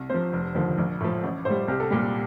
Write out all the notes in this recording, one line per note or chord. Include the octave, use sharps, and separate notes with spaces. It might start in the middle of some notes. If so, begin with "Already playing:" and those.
Already playing: C2
C3 F3 C5
F1
D#2 D3 F3
A#1
A2 F3
A1
A2 G3 C5
C2 G4
A4
A#2 G3 G4